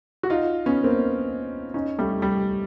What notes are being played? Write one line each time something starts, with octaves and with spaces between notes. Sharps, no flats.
F#4
D#4 F4
B3 C#4
A#3 C4
C#4 D#4
G3 A3
G3